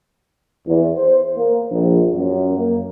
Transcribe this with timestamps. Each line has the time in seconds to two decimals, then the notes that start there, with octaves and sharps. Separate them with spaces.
0.67 E2
0.97 C5
1.36 A#3
1.71 A#1
2.12 F#2
2.56 A#3